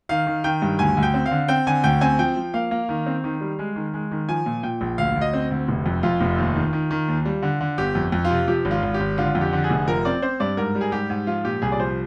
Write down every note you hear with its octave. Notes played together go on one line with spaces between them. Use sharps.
D#3 F5
D#3
D#3 G5
G2
D2 G#5
D2
G5
C4
F5
D3
C4 G5
D3 G#5
D2 G5
C4 G#5
F3 G5
F3
A#3 F5
A#3
D#3
C4
D#3
G3
G#3
D#3
G#3
D#3
F3 G#5
A#2
A#2 G5
A#1
D2 F5
D2
D#5
C4
D2
F1
F2
F2 F4
F1
D#2
D#3
D#3
D#3
D#2
G3
D3
D3
G1 G4
F2
F2
F4
C3
F3 G4
G#1
F4
G#1
G4
G#1
D3 F4
F2
G4
D3
G#4
F1
F3 A#4
C4 D5
C4 C5
G2 D5
G#2 A#4
G3
G#4
G#2 G4
G#2
F3 F4
A#2 G4
C2 G#4
D5
F3 C5